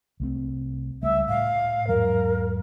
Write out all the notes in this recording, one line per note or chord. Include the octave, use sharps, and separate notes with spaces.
C2 A3 C4
C#2 G3 A3 E5
A2 F5
E2 G#2 F#3 A#4